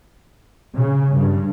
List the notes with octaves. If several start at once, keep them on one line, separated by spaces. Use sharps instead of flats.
C#3
G2